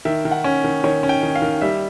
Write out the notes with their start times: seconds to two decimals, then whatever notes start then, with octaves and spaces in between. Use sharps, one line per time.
0.05 D#3 E5
0.25 D#3
0.31 F#5
0.44 C#4
0.64 D#3
0.84 D#3 C#5
1.03 C#4
1.09 G5
1.23 D#3
1.35 F5
1.42 D#3
1.62 G3 E5